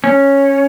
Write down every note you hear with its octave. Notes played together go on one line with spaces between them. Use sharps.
C#4